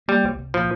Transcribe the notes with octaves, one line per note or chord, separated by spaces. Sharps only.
G3 A#3
C2
C2
A#2 F3